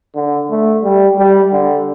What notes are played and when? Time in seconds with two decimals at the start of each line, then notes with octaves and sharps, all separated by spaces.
0.16 D3
0.50 A3
0.84 G3
1.18 G3
1.53 D3